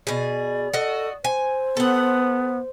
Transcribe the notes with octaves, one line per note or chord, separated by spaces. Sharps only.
B2 G#4 D5
F#4 A4 D#5
C5 G#5
B3 A4 F#5